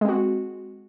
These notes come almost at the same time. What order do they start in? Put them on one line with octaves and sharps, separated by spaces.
G#3 C4 F#4